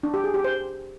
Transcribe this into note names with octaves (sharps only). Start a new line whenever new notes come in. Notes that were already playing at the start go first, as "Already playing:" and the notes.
D4
G4
G#4
G4
C5